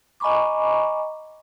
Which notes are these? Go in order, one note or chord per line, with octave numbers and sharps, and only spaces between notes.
D#5 G#5 A#5 B5 C#6 D6